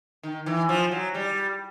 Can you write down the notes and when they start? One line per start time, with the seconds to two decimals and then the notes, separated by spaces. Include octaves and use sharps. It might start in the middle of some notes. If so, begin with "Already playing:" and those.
0.23 D#3
0.46 E3
0.69 F3
0.92 F#3
1.14 G3